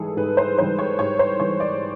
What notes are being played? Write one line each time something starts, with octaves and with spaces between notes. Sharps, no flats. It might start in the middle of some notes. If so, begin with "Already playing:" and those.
Already playing: G#2 E3 G3 G#4 A4
G#2 B4
C5
E3 G3 C5
C#5
G#2 C#5
C5
E3 G3 C#5
D5